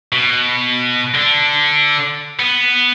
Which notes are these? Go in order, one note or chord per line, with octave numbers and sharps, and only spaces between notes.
B2
D3 D4
B3